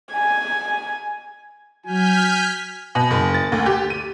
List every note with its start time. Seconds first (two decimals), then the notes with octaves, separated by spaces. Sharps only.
0.12 G#5
1.86 F#3 G#5 F6 G6 B6
2.95 B2
3.11 F#1
3.34 A6
3.52 D2
3.66 G4
3.90 D#7